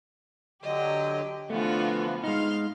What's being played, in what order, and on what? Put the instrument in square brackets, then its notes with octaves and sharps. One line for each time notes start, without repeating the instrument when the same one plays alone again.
[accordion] D3 F#3 [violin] G4 [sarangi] D#5
[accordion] D3 E3 F3 [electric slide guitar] A3 [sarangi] B3 [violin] F4 F#4
[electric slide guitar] G#3 D#4 [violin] F5 C6 [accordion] F6